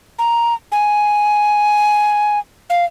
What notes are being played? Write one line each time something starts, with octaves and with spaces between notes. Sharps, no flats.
A#5
G#5
F5